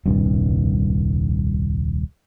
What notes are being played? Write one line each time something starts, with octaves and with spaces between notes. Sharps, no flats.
D#1 C2 G2